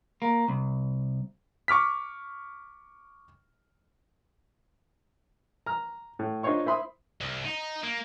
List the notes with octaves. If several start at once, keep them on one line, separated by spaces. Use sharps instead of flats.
A#3
C2
C#6 D6 F6 B6
A#5 F6
A2
D4 D#4 F4 C5 C#5 C#6
E4 C5 E5 B5 C6 D#6
C2
D#4
A#3